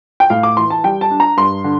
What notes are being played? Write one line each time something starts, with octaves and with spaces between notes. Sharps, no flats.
G5
A2 F5
D6
E3 C6
A5
G3 G5
A5
D4
A#5
G2 C6
D3